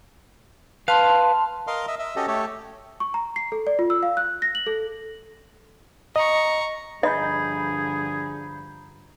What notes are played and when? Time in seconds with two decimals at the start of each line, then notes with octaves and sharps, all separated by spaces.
0.88 B4 F5 A5 C6
1.67 A#4 D#5 F5 C6
1.88 D#5 E5
1.99 D#5 E5
2.16 C#4 F#4 G4 A4 D#5
2.28 A3 G4 A4 C#5
3.00 C#6
3.14 A#5
3.36 C7
3.52 A4
3.67 D5
3.79 F4
3.90 E6
4.03 F5
4.17 F#6
4.42 A#6
4.55 F#7
4.67 A4
6.16 D#5 A#5 C#6
7.03 G2 D3 F3 G#4 D#5 A#5 B5 G6